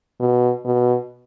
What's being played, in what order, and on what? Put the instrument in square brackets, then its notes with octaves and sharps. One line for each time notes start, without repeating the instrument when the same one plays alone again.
[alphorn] B2
B2